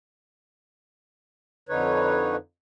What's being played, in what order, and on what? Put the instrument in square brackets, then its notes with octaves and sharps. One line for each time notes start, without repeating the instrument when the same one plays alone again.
[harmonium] F2 D3 D#4 B4 C#5